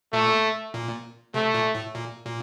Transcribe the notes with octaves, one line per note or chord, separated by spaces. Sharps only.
A#2 A3
A#2
C3 A3
A#2
A2
A#2
A#2